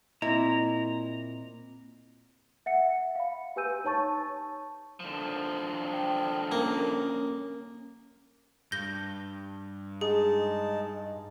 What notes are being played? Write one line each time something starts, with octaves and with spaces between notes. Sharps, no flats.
A#2 A#3 C4 E4 D#5 A#5
E5 F#5 C#7
F5 B5
G4 B4 G#5 E6 G6 D#7
D#4 C#5 A5 C#6 A6
D3 F3
G5
A#3 C#4
G2 G6 A#6 G7
G#3 D#4 G#4 A5